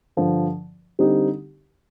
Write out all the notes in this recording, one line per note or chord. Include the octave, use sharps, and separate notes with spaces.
G2 D3 F3
D3 G3 C4 D#4 G4